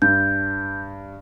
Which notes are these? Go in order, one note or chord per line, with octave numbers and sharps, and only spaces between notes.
G2 G6